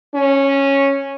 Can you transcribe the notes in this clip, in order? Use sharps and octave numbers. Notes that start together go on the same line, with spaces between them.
C#4